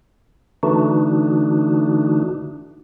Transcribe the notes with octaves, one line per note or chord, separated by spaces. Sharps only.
D3 E3 A3 D4 D#4 F#4